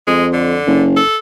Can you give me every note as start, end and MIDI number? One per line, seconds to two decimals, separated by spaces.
0.07 0.58 41
0.07 0.25 56
0.33 0.85 50
0.67 1.00 30
0.96 1.17 69